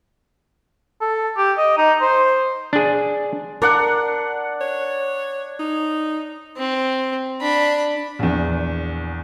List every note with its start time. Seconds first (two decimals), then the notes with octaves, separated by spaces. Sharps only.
1.01 A4
1.37 G4
1.58 D#5
1.77 D#4
2.01 C5
2.73 D4 G#4
3.62 D4 A#4 D5 F#5
4.61 C#5
5.60 D#4
6.57 C4
7.41 D4 B5
8.19 A#1 E2